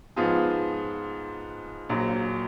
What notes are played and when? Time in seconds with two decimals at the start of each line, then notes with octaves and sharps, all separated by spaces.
0.16 G#2 F3 B3 F4 G#4
1.89 A#1 A#2 F#3